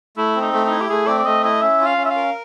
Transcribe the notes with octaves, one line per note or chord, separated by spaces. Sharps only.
A3 E4
C4
D#4
A3
D#4
E4
G4
A3 G#4
C4 D5
D5
A3 D#5
E4 D#5
C#4 E5
F4
F5
C#4
E5
F5
A#4